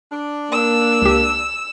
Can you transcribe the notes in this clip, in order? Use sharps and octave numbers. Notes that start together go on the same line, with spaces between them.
D4
A#3 E6
C#2 G4